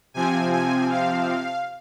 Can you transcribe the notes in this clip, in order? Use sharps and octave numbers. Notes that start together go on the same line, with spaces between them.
C3 F3 C4 G#5
G#5
F5